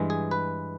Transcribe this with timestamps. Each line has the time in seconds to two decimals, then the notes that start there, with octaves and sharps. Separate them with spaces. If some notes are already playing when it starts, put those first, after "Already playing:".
Already playing: G2 E3 G#3
0.10 G#4
0.31 B4